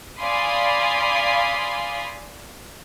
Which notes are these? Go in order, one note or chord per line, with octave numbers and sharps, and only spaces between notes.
D5 F5 G#5 B5 C6 D#6